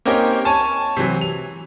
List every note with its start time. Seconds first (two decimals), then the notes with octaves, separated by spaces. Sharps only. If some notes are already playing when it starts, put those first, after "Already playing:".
0.05 A#3 C4 C#4 D#4 G4 A#4
0.45 C#5 G#5 A5
0.97 C3 E3 F#3
1.21 F7